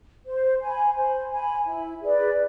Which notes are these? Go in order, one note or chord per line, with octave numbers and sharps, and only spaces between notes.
C5
G#5 B5
C5
G#5 B5
E4
G#4 B4 D5